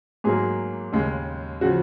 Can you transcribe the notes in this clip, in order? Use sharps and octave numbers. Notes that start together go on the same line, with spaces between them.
G#2 F#3 A#3 G#4
D#2 C#3 G#3
C#3 F3 F#4